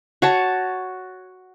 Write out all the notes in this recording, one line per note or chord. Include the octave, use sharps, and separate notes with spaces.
F#4 C#5 A5